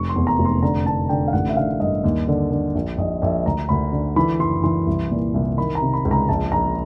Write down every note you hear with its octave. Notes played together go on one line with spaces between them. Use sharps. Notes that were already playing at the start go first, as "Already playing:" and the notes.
Already playing: F1 C#6
C6
E2
A#5
F1
C6
D3 A#5
D3 A5
D3 G5
F5
A1 F#5
E5
D3 F5
G2 D#5
D#2
D3
D3
A#1
A#1 D#5
A#1 E5
D2 A#5
D2 B5
D3
E3 B5
F#1 C6
E3 C6
C2
A#2
C2
D#3 B5
A#5
C3
B5
C#2
A#5
A#1 A5
A#1 A#5